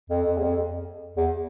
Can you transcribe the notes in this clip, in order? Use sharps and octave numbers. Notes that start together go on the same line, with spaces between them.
F2
F2
E2
F2
E2